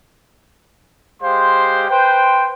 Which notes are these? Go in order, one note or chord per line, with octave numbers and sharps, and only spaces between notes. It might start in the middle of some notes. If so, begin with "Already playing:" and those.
G#3 G4 C5 F5 C6
B4 C5 G5